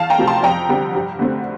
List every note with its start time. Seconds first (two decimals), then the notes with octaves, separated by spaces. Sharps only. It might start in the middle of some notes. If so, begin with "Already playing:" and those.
Already playing: E2 F5 A5
0.10 G5 A#5
0.18 C3 F3 A3
0.27 A5 C6
0.43 F2 G5 A#5
0.69 D3 G3 C4
0.95 G2
1.19 D3 A3 C4